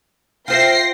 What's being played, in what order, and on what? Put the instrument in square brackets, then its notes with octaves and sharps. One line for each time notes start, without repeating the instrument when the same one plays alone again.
[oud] F4 C5 E5 [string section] G5 A#6 C7